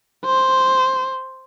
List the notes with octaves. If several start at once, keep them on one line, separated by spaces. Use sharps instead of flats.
C5